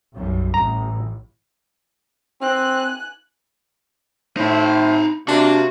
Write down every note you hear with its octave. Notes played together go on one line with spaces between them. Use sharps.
B1 F#2 G3
A1 A2 A#5
C4 G#5 F#6
A2 D#4 C5 B5
C3 A#3 D4 F#4